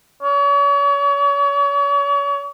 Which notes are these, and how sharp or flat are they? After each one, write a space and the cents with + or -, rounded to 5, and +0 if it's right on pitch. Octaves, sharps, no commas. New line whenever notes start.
C#5 +40